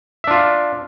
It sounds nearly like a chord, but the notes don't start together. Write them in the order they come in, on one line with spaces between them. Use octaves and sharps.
E5 D4 F4